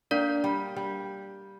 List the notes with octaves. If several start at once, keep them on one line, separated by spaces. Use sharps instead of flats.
A#3 D4 D5
G3
G3